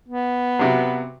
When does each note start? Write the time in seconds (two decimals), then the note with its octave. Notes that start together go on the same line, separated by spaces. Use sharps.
0.08 B3
0.59 C3 F#3